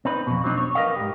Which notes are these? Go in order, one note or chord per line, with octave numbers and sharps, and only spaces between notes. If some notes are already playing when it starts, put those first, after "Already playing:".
C4 D#4 B4
F2 B2
F#3 C4 D4 D#4
C#5
A#4 B4 D5 D#5 F5
G#2 G4